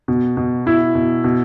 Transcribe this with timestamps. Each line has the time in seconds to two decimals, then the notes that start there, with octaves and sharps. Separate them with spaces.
0.08 B2
0.37 B2
0.66 B2 E4
0.95 B2
1.24 B2